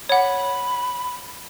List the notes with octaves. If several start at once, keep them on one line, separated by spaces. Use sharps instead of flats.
C#5 F#5 B5